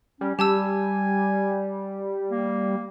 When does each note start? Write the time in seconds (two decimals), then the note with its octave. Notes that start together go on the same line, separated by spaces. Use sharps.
0.21 G3 C#4
0.39 G3 G4 G#5 A5 E6
2.31 A#3